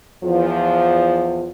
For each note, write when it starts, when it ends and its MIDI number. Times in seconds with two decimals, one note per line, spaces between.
0.24 1.51 40
0.24 1.51 53